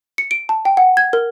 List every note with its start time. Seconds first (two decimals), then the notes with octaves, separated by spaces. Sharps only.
0.18 C#7
0.31 D7
0.49 A5
0.65 G5
0.77 F#5
0.97 G#6
1.13 A#4